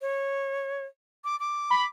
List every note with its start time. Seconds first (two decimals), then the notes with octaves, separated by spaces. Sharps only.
0.01 C#5
1.24 D6
1.40 D6
1.70 B5